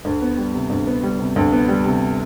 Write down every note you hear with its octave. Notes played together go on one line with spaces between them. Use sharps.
D2
B3
G3
C3
D2
B3
G3
C3
D2
B3
G3
C3